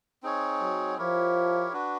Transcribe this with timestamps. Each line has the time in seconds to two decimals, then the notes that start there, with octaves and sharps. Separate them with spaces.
0.23 C4 D#4 G#4 C#5
0.61 F#3
0.98 F3 E4 G4 A#4 C#5
1.73 D4 F#4 B4